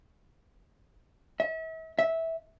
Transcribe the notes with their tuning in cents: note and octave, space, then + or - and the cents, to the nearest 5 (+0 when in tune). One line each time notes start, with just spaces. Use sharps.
E5 -40
E5 -15